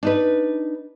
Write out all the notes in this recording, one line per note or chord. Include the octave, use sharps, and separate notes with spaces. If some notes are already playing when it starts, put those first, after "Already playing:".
D4 D#4 B4